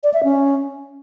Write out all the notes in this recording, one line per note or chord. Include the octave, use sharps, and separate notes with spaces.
D5
E5
C#4